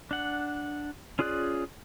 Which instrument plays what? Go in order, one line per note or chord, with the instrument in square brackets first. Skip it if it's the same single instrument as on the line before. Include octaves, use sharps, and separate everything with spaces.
[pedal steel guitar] D4 F#5
C#4 F4 G#4 D5 F#6